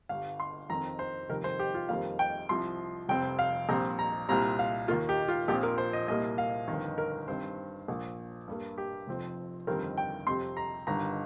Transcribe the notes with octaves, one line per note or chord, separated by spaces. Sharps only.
G1 G2 G3 F5
C6
F2 D#3 C4 A#5
C5
F1 F2 D#3 G3 C4 A#4
C5
G4
F4
F2 D#3 G3 A#3 F5
G5
C2 C3 F3 C6
F1 F2 C3 G3 C4 G5
F5
A#1 A#2 G3 C4 A#5
A#5
C2 A#2 G3 C4 A#5
F5
D#2 D#3 A#3 F4
G4
F4
A#1 A#2 F3 C4 G4
A#4
C5
D#5
C2 A#2 G3 A#3 D#5
F5
G1 F2 D#3
A#4
G2 D#3 C4 C5
A#1 A#2 A#3
G2 G3 A#3
G4
F1 F2 F3 C4
G1 F2 D#3 G3 C4 A#4
G5
F2 C3 G3 C4 C6
A#5
G1 G2 D#3 A#5